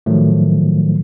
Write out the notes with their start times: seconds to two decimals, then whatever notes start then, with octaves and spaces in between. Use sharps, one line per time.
0.06 A2 D#3 F3 F#3 A3